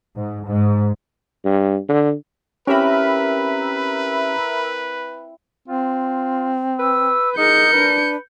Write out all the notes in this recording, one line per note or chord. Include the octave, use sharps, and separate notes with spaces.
G#2
G#2
G2
D3
C4 C#4 E4 G4 A#4 B4 E5 B5
C4 F4
B4 E6
D#4 G#4 A#4 G6 C#7
D4 B4